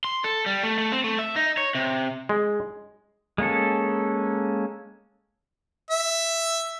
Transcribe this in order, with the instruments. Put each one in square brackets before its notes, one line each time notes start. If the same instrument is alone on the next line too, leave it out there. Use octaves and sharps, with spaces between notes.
[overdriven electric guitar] C6
A4
G3
A3
A3
C4
A3
E5
D#4
C#5
C3
[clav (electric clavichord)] G#3
[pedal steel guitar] G#3 A#3 C#4 A4
[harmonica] E5